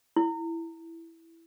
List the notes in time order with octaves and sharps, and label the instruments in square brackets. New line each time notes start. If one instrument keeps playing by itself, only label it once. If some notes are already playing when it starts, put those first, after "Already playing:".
[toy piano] E4